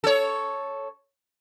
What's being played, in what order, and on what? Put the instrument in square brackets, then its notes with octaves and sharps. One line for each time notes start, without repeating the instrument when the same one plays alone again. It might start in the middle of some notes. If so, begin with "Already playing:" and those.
[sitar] A4 C#5